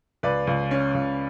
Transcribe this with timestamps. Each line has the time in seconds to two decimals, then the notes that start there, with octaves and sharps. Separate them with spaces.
0.23 C#2 B4 D5
0.47 C#2
0.71 C#4
0.95 C#2